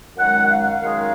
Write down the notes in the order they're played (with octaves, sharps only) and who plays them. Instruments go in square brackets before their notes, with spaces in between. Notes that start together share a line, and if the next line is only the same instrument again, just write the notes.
[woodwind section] F#2 D#3 G#3 F#5
F#5
F5
F#2 D#3 G#3